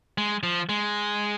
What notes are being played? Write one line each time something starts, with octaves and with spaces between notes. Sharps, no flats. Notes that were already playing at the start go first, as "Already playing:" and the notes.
G#3
F3
G#3